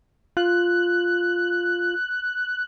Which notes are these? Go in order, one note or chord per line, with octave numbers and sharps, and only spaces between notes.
F4 F#6